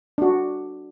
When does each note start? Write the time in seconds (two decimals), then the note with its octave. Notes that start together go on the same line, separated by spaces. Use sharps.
0.18 D4 F#4